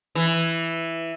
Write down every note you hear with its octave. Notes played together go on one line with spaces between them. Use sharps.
E3